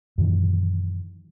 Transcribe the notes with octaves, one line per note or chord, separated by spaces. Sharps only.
F#2 A#2 D#3 E3